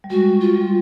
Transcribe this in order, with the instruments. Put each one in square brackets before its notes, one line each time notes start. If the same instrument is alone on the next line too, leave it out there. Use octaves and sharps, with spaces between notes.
[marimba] G3
[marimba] G#3 [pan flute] F#4
[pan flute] F4
[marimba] G3